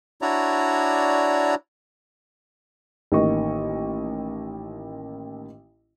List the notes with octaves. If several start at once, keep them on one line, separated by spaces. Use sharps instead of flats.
D4 E4 F#4 C#5 D5 A#5
A1 D#3 A#3 D#5 C#6